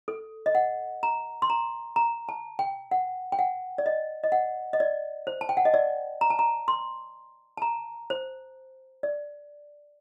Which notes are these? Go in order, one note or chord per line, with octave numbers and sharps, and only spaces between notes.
A4
D#5
F#5
A#5
C6
A#5
A#5
A5
G5
F#5
G5
F#5
D5
D#5
D#5
F#5
D#5
D5
C5
A5
G5
F#5
D#5
D5
A#5
A5
A#5
C6
A5
A#5
C5
D5